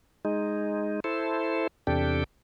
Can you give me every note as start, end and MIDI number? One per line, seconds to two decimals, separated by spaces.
0.25 1.00 56
0.25 1.00 63
1.04 1.67 64
1.04 1.67 69
1.04 1.67 72
1.87 2.24 40
1.87 2.24 48
1.87 2.24 62
1.87 2.24 67
1.87 2.24 69
1.87 2.24 79